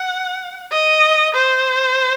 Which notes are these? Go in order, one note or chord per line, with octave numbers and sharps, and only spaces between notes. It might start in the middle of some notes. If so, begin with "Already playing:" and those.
Already playing: F#5
D#5
C5